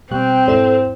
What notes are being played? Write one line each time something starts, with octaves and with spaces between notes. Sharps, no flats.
B2 G3 C4 G5 F#6
G#2 E4 A4 C5 E7